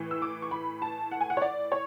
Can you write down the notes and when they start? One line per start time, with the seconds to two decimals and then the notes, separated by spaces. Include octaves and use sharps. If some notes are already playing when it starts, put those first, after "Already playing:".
Already playing: A2 E3
0.11 E6
0.22 D6
0.42 C#6
0.51 B5
0.82 A5
1.11 F#5
1.21 G#5
1.30 F#5
1.37 C#5
1.42 D5
1.72 C#5